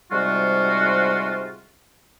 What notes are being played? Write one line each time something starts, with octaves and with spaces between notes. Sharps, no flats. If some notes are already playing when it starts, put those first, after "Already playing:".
G#2 C3 G3 F4 F#4